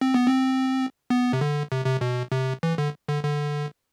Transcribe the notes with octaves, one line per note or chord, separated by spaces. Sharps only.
C4
B3
C4
B3
C3
D3
C3
C3
B2
C3
E3
D3
D3
D3